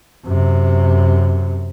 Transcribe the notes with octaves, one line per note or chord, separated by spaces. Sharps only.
F#2 C3